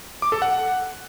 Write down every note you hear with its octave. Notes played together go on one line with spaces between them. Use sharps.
D6
A4
F#5